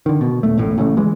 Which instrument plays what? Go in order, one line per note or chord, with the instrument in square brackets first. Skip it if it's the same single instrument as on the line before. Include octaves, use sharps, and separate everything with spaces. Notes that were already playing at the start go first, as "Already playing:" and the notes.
[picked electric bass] D3 D#3
B2
D#1 A3
E1 A1 A2
A1 C#3 A3
E3 G#3